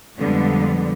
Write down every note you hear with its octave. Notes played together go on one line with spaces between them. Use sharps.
F2 D3 F3 G3 G#3 B3